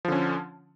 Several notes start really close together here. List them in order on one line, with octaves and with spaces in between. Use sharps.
F3 D3 C#4